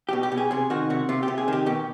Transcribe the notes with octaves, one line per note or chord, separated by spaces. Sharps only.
B2 G4
G4
B2
G#4
C3 G#4
D#3 F#4
C3 F#4
C3 F4
G4
C3
G#4
D#3 G4
B2 G4